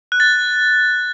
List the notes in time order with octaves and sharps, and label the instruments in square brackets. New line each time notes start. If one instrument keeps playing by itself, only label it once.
[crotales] F#6
A6